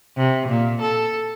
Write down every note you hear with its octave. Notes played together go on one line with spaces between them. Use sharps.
C3
A#2
A4